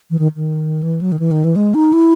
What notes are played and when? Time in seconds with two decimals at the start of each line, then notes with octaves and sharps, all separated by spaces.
0.11 E3
0.19 D#3
0.36 D#3
0.83 E3
1.01 F#3
1.12 D#3
1.19 E3
1.31 D#3
1.44 E3
1.56 G#3
1.74 D#4
1.93 E4